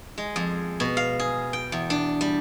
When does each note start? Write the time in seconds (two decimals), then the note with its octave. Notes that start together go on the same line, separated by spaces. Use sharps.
0.18 G#3
0.36 F2
0.80 B2
0.97 F5
1.19 G#4
1.53 G5
1.72 E2
1.90 D4
2.21 G3